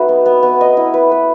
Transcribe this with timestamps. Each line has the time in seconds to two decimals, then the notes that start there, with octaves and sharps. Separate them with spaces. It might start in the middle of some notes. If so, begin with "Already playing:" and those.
Already playing: A3 D#4 F#4 B4
0.09 B3
0.26 B3
0.43 B3
0.61 D#5
0.77 E4
0.94 B4
1.11 B4